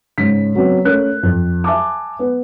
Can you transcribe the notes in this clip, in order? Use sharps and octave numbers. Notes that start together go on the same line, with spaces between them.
G#2 C#3 B6
C#3 F#3 B3 C4
A3 C#4 A#4 F#6
F2
E5 G#5 A5 D6
B3